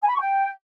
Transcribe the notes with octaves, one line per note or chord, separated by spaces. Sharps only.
G#5
B5
C#6
G5